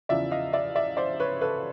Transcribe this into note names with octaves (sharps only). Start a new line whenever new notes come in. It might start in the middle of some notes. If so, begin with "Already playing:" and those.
E2 C#3 F3 D5 E5
D#5 F5
D5 E5
D5 E5
C5 D5
B4 C#5
A4 B4